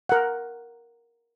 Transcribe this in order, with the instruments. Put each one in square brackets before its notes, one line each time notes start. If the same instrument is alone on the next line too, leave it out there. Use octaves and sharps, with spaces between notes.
[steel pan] A#4 F#5